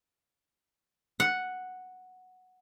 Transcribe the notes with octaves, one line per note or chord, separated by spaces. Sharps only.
F#5